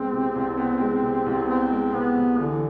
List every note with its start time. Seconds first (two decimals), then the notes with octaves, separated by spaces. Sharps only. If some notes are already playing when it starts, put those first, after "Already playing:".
Already playing: C2 C3 G#3 B3 C4
0.13 C3
0.35 C2
0.58 B3
0.80 G#3
1.03 C3
1.26 C2
1.48 B3 C4
1.71 G#3
1.93 C3 B3
2.16 C2
2.39 D3 E3